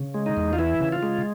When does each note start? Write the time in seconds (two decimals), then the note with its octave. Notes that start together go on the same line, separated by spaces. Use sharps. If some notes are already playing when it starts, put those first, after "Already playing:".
Already playing: C#3
0.14 G#3
0.26 D#4
0.37 E2
0.53 F4
0.59 E3 E4
0.80 C#3
0.92 F4
1.03 G#3